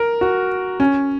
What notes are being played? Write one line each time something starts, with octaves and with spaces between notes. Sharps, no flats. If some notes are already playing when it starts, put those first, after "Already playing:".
Already playing: A#4
F#4
C#4